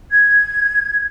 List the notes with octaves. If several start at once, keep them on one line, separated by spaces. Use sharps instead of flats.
G#6